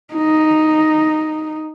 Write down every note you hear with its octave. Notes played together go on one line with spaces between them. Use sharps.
D#4